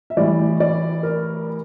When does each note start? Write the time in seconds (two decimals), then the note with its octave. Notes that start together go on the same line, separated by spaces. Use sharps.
0.10 E5
0.17 A2 E3 G3 D5
0.60 D5
1.03 A#4